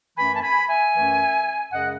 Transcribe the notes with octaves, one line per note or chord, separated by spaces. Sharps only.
F#2 E3 A3 C#4 G#5 B5
A5
G#5 B5
E5 G#5
F#2 E3 A3 C#4
F#2 C#3 G#3 D#5 F#5